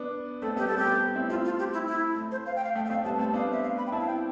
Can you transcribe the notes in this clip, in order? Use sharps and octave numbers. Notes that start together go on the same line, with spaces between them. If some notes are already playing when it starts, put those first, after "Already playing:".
Already playing: B3 D4
A3 C4 A4
G3 B3 G4
G3 B3 A4
G4
A3 C4
C4 E4
A3 C4 F4
F4
G4
E4
E4
A3
C5
F5
G5
F5
A3 G5
G5
A3 C4 F5
G3 B3 A5
A3 C4 A5
B3 D4 F5
E5
F5
B5
G5
C4 E4 A5
F5
G5